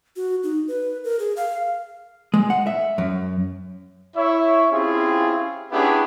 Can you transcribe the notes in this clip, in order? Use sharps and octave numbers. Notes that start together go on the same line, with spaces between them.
F#4
D#4
B4
A#4
G#4
F5
G#3
F#5
E5
F#2
E4 C#5 E5
C4 C#4 E4 F4 G4 G#4
B3 C#4 D4 E4 G4 G#4